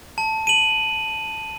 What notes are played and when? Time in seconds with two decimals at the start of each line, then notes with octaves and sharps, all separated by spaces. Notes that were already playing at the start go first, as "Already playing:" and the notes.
0.18 A5
0.47 D#7 F#7